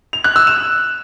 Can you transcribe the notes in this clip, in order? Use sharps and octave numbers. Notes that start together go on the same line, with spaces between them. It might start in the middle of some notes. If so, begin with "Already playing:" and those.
F7
F#6
E6
E7